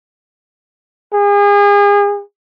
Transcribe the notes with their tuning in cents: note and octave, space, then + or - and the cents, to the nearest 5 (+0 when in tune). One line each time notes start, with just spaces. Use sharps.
G#4 -35